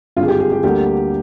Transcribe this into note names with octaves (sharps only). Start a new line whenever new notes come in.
G#1 G2 D3 F4
G#4
G4
G#4
G4
D2 D3 G3 A#3 G4